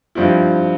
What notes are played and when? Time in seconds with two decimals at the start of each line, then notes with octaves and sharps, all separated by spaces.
0.15 G2 F3 C4 E4